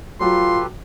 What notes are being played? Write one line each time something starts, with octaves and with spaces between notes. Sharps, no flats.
F#3 F4 G4 A4 B4 C6